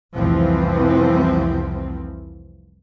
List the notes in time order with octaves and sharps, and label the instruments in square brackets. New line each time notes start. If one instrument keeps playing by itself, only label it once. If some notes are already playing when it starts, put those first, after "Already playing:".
[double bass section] F1 C2 E3 F3 C4